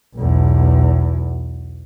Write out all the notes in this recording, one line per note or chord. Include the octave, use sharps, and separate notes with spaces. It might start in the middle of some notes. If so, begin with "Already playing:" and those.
B1 E2